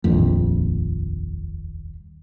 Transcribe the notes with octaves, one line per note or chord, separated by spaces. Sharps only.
D#1 A#1 F2